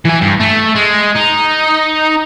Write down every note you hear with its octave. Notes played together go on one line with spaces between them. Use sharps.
E3 G#5
G2
A3
G#3
D#4